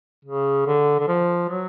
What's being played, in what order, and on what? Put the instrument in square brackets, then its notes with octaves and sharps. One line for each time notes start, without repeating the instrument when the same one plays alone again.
[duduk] C#3
D3
D3
F3
F#3